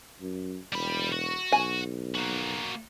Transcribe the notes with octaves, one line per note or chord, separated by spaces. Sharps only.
F#2
E1 G3 B5
F#4
B1 G#5
A#3 F#4